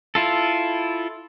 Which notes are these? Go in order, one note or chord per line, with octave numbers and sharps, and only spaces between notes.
E4 F4 A4